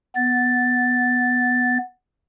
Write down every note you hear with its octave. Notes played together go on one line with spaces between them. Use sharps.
B3 A6